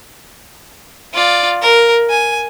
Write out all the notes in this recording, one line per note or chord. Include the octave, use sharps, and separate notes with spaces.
F4 D5
A#4
G#5